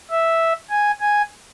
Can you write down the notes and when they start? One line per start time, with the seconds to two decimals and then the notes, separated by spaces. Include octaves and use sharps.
0.11 E5
0.70 G#5
1.01 G#5